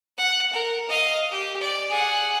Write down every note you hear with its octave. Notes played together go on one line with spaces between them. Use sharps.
F#5
A#4
D#5 F5
G4
D5
G#4 F#5